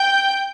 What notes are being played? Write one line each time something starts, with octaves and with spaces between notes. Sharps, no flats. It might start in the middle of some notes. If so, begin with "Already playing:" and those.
Already playing: G5 G6